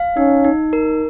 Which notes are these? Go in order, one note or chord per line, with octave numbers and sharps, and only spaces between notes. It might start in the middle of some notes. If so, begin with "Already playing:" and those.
Already playing: F5
C#4 D#4
D#4
A#4